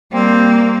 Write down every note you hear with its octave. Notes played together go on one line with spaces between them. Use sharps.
G3 A#3 C4